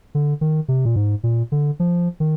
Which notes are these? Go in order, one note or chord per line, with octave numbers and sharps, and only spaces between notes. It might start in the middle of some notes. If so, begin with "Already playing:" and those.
D3
D#3
C3
A#2
G#2
A#2
D3
F3
D#3